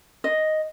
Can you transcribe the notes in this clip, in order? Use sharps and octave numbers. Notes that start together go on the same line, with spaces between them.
D#5